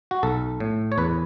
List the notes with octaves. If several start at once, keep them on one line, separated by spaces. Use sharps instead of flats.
F#4
B1 A4
A2
C#5
E2 B4